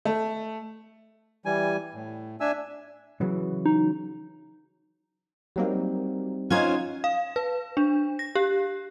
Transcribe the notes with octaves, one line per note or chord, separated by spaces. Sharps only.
A3
E3 G3 G#5
A2
D4 E5 G#5 E6
C#3 E3 F#3
D#4
F#3 G3 A#3 C4 D#4
C#4 D#4 F4 C5 F#5 G#6
F5
B4
D4
A#6
G4